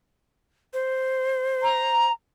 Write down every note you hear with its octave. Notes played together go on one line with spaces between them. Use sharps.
C5
A#5